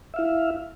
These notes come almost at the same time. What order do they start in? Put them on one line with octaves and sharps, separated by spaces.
E5 F5 E4